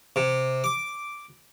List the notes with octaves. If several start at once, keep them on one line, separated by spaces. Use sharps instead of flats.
C3
D6